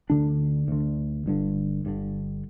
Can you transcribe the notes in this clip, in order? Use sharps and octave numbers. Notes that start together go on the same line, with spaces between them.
D2 D3 D4
D2 D3
G1 G2 D3
G1 G2 D3